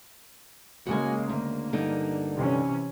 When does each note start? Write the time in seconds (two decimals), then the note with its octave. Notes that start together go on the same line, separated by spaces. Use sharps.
0.87 C#3 G#3 A#3 F#4 G5 G#5
1.29 D2 A#3
1.73 G2 D3 D#4
2.34 C3 E3 C#4